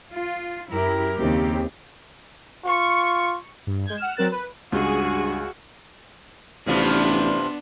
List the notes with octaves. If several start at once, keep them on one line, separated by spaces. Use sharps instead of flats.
F4
F#2 E4 G4 A#4
D#2 C#3 C4 G4
F4 C#6
G2
G#3 G6 G#6
F#5 F6 E7
F#3 C4 A#4 F#6 A6 E7
B4
C#2 G2 F#4 G#4 G#5
A1 G2 C3 F3 B3 D4